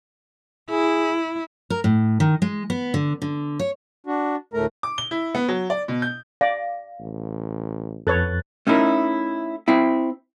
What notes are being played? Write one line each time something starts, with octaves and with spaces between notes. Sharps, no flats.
E4 G#4
A#4
A2
D#3
G#3
B3
D3
D3
C#5
D4 F#4
D2 A2 A3 A#4 A#5
D6
G7
E4
B3
F#3
D5
B2
G6
D5 F5
A1
F2 A4 B4 C#5 F#6 A6
A3 C#4 D#4 E4 A#4
C4 E4